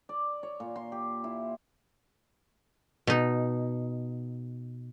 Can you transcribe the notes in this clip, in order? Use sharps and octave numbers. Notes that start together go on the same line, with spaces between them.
D5
C#5
A#2
C6
G4
E4
B2 D#4